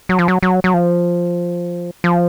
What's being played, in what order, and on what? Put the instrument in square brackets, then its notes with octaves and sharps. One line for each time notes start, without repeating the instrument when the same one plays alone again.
[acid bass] F#3
F3
F#3
F#3
F#3
F3
F3